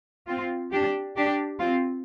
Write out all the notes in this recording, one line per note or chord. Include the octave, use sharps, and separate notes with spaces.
C4 F4
D4 G4
D4 G4
C4 F4